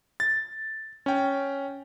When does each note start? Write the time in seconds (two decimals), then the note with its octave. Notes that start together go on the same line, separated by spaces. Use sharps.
0.20 A6
1.06 C#4 G5